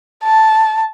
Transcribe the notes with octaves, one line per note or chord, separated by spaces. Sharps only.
A5